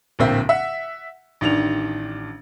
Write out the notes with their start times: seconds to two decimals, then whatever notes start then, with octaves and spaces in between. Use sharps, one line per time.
0.19 D1 A#1 A#3 C4 E5
0.49 E5 F#5
1.41 A1 D#3 D4 F7